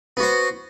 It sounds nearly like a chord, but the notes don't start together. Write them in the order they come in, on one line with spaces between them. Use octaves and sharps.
B3 F#4 C5